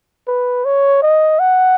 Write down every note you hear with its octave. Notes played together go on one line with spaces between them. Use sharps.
B4
C#5
D#5
F#5